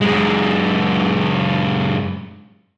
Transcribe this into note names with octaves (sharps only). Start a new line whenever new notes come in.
F#2 G#3